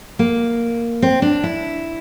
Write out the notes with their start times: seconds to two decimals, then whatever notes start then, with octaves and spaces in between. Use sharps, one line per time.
0.19 A#3
1.02 C4
1.22 D4
1.44 E4